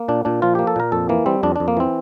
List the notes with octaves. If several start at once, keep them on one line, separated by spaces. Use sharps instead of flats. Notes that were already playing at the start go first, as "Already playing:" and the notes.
Already playing: A#3
A#2 D4
A#2 D4
F3 F4
A#3 G4
A4
A#2 A#4
F2 A4
E3 A#3
G3 C4
F2 D4
F2 D4
A#3
E3 C4